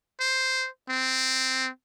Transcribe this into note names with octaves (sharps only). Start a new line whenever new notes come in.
C5
C4